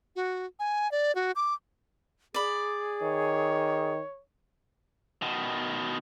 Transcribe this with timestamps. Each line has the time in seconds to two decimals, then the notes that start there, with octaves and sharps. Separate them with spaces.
0.16 F#4
0.59 G#5
0.91 D5
1.15 F#4
1.36 D6
2.34 G#4 D5 B5
3.02 D#3 C#5
5.22 B2 D#3